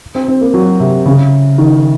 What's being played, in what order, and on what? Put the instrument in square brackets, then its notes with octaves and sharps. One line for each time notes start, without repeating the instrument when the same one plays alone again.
[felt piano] C4
C4
A#3
F#3
C3
C#3
D#3